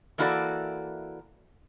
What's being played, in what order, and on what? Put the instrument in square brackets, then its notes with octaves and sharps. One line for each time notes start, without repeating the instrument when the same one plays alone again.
[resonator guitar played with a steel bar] E3 A#3 E4 F#4 A4 D5